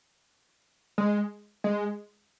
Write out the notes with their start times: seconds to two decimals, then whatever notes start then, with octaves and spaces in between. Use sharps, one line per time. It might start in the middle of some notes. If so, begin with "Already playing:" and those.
0.98 G#3
1.64 G#3